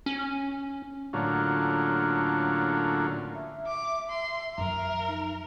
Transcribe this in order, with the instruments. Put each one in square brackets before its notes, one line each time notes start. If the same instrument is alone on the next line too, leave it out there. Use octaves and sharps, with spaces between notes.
[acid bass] C#4
[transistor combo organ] A2 D3 F#3 A#3 C#4 F4
[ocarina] E5
[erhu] D6
C6
[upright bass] F#2 F3 [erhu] A#4
[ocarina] D#4